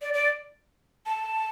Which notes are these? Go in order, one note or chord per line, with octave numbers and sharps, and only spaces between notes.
D5
D5
A5